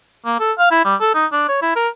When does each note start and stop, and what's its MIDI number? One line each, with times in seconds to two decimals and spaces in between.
0.26 0.40 58
0.40 0.52 69
0.59 0.71 77
0.71 0.83 64
0.85 0.95 55
1.01 1.13 69
1.15 1.26 63
1.32 1.44 62
1.48 1.60 73
1.62 1.74 64
1.76 1.88 70